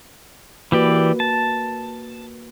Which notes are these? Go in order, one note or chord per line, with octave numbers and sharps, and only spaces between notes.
E3 A#3 F#4 G4 B4 D5
A5